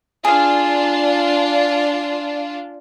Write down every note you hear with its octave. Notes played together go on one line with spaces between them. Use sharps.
D4 F4 G#4 F5